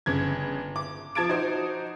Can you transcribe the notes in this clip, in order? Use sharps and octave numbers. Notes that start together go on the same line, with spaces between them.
G1 C#3 G#6
D6
F3 A5 G#6 A6 D7
D#4 F#4 C5